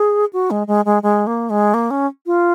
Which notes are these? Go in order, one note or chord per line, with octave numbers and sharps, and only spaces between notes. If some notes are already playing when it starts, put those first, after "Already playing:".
Already playing: G#4
F#4
G#3
G#3
G#3
G#3
A#3
G#3
A#3
C#4
F4